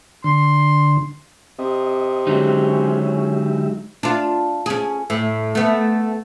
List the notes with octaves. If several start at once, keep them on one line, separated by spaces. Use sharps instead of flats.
D3 C6
C3 D#5
D3 F#3 G#3 C#4 D#4 G4 E5
D4 F4
C#4 G#4
A2
A3 B3